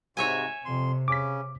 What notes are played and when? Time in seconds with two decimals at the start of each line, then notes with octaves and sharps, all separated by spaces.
0.17 G#2 C3 F#4 C#5 E5 G#5
0.65 F2 C3 C6
1.08 C#3 C#4 D6 B6